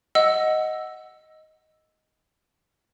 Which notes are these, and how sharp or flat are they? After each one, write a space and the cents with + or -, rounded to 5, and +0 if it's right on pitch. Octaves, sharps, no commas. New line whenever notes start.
D#5 +5 F#5 +0 E6 +0